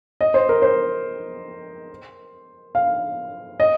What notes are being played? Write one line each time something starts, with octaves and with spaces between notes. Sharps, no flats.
D#5
C5
A#4
C5
F5
D#5